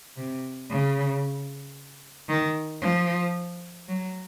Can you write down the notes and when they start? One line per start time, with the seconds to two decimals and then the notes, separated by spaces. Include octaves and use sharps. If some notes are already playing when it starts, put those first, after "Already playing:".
0.17 C3
0.71 C#3
2.29 D#3
2.82 F3
3.88 F#3